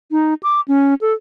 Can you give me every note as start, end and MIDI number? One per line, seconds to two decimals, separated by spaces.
0.11 0.34 63
0.43 0.60 86
0.68 0.94 61
1.01 1.13 69